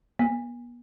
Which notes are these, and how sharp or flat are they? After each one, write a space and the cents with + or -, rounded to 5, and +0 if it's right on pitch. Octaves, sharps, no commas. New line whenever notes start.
B3 -40